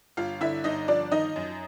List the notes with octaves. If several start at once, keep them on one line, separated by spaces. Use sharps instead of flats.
G1 F4 F5
D3 E4 E5
G1 D#4 D#5
F3 D4 D5
D#3 D#4 D#5
F#2